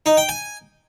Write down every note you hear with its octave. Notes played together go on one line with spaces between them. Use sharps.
D#4
G5
G#5